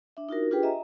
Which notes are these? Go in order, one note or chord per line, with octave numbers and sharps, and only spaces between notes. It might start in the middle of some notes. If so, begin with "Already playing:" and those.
D4 E5
D#4 F4 F#4 A#4
D4 F4 G4 G#4 B4 G5
D#5 E5 G#5 A#5